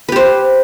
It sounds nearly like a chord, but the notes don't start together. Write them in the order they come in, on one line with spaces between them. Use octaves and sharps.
B4 G4 C5